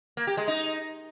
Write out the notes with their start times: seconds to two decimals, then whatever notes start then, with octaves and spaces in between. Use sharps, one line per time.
0.17 A#3
0.27 G4
0.37 G#3
0.48 D#4